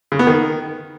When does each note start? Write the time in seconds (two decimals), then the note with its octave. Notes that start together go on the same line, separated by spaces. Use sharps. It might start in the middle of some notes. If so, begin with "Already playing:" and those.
0.12 C#3
0.19 B3
0.27 D#3